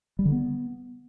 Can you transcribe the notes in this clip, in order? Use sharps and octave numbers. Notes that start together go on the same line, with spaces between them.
G3
D3
B3